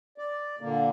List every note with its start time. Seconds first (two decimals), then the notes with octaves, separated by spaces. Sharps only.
0.18 D5
0.61 A#2 D3 A#3